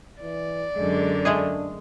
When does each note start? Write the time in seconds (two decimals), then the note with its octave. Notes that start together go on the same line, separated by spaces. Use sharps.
0.22 E3 D5
0.76 F#2 D3 G#3
1.25 G#3 A3 D4 G#4